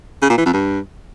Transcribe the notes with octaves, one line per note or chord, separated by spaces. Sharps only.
C#3
A#2
E3
F2
G2